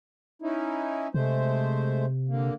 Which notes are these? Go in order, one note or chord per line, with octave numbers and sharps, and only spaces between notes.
C#4 D#4 E4
C3 G#3 A3 C5
D3 A#3